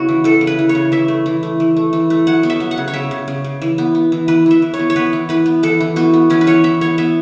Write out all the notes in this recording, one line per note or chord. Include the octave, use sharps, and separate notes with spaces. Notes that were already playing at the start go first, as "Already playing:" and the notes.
Already playing: C#3 B3 E4 F#4
E3
E3 A4
C#3
B4
E3
C#5
C#3
E3 E5
A3
E3
A3
E3
A3
E3
A3
F#3 F#5
B3
E5
F#3
F#5
C#3
C#5
C#3 E5
C#3
C#3
C#3
E3
B3
B3
E3
E3 B4
E3 E5
E3
C#5
B3
C#5
B3 B4
E3
E3 B4
B3
E3 A4
E3
B3 F#4
B3
E3 C#4
B4
E3 C#5
E3 E5
B3 C#5
B3 E5